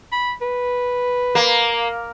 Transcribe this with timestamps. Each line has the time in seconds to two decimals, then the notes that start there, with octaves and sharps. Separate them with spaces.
0.12 B5
0.41 B4
1.35 A#3